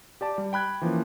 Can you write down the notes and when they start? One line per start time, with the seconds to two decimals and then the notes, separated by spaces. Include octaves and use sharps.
0.21 G4 D5 A5 D6
0.38 G3
0.53 G5 B5 F#6 G#6
0.82 E3 F3 A#3 C#4